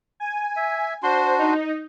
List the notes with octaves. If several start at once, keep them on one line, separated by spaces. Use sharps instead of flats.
G#5
E5
D4 F#4 C5 C6
D#4